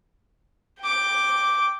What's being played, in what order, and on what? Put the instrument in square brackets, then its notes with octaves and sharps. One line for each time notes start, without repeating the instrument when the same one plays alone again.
[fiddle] G5 D6